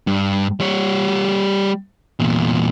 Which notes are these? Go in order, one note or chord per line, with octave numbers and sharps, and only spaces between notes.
G2
G3 C#5
E2 A#2